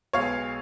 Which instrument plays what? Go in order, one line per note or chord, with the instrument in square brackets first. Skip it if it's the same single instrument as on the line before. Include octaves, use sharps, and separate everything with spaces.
[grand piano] B1 B2 G#3 C#5 F5